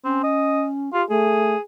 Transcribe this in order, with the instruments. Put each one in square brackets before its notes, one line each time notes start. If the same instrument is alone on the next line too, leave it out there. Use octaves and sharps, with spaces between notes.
[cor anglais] C4 [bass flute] C#4
[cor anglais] D#5
[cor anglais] F4 [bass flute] G4
[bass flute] A3 [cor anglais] G#4